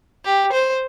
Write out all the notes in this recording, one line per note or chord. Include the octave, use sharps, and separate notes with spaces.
G4
C5